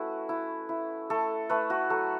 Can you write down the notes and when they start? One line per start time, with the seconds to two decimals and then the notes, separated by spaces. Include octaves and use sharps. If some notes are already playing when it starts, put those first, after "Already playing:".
Already playing: A3 C#4 E4 F#4 B4
0.29 E4
0.69 E4
1.10 A3 A4
1.50 A3 B4
1.70 F#4
1.90 F#3 A4